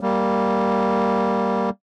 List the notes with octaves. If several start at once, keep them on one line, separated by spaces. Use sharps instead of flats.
G3 A#3